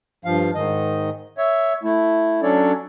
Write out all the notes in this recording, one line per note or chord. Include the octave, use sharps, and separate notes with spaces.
G2 F3 F5
G#2 D#3 D#5
C#5 E5
A3 E4
F#3 C#4 D4 A4 C#5 D5